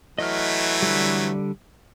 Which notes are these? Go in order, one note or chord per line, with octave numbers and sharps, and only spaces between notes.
E3 F#3 A3 D#5 F6
D3 G3